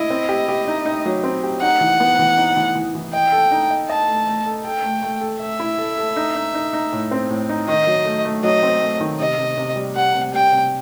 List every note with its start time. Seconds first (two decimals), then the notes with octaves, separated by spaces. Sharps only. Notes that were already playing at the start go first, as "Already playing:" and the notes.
Already playing: E4 D#5
0.10 C4
0.29 G4
0.48 G4
0.67 D#4
0.86 D#4
1.06 F#3
1.24 C4
1.43 G4
1.62 D#4 F#5
1.81 E3
2.00 B3
2.19 E3
2.37 D#4
2.57 E3
2.75 E3
2.95 E3
3.13 D#5 G5
3.32 A4
3.51 D#4
3.70 D#5
3.90 D#5 A5
4.08 A3
4.27 A3
4.46 A4
4.65 A4 G5
4.84 A3
5.03 A3
5.21 A4
5.41 A3 E5
5.60 E4
5.78 A4
5.98 A4
6.16 D#4
6.36 D#4
6.54 D#4
6.73 D#4
6.93 A2
7.11 C4
7.30 A2
7.49 D#4
7.68 D#3 D#5
7.87 F#3
8.05 A3
8.25 A3
8.43 F#3 D#5
8.62 C4
8.81 A3
9.00 D#3
9.19 C3 D#5
9.38 C3
9.57 C3
9.76 G3
9.95 G3 F#5
10.14 C3
10.33 G3 G5
10.52 C3